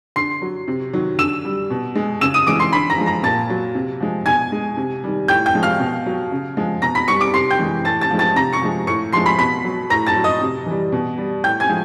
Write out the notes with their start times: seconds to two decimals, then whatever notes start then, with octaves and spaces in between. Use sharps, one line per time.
0.16 D3 C6 C7
0.42 F#3
0.68 C3
0.93 D#3 F#3
1.18 D3 E6 E7
1.45 G3
1.70 B2
1.95 G#3
2.21 C#3 E6 E7
2.34 D#6 D#7
2.47 E3 G#3 D6 D7
2.59 C6 C7
2.73 D3 B5 B6
2.90 A#5 A#6
2.98 F3 G#3
3.06 A#5 A#6
3.23 A#2 A5 A6
3.50 F#3
3.75 C3
4.00 F3 G#3
4.26 B2 G#5 G#6
4.52 G#3
4.77 C3
5.04 D#3 G3
5.28 A2 G5 G6
5.46 G5 G6
5.54 F3 G#3
5.63 F5 F6
5.80 B2
6.06 F#3
6.31 C#3
6.57 F3 G#3
6.82 B2 A#5 A#6
6.95 B5 B6
7.08 G3 C#6 C#7
7.21 D6 D7
7.33 C3 C6 C7
7.51 G5 G6
7.59 E3 G#3
7.85 A2 A5 A6
8.01 A5 A6
8.11 F3 G#3
8.19 A5 A6
8.36 C3 A#5 A#6
8.53 C#6 C#7
8.62 F3 G#3
8.87 A2 C#6 C#7
9.13 F3 G#3 C6 C7
9.26 B5 B6
9.39 B2 B5 B6
9.64 F#3
9.90 A2 A#5 A#6
10.07 A5 A6
10.16 F#3
10.24 D#5 D#6
10.41 C3
10.66 E3 G3
10.92 B2
11.18 G3
11.43 A2 G5 G6
11.60 G#5 G#6
11.69 F3 G#3